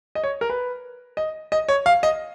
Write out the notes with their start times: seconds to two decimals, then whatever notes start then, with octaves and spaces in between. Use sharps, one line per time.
0.15 D#5
0.23 C#5
0.41 A#4
0.50 B4
1.17 D#5
1.52 D#5
1.68 C#5
1.86 F5
2.03 D#5